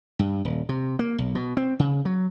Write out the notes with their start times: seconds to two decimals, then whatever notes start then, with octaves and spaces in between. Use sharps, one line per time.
0.19 G2
0.45 D#1
0.69 C3
0.99 A#3
1.18 B1
1.35 B2
1.57 C4
1.79 C#3
2.05 F#3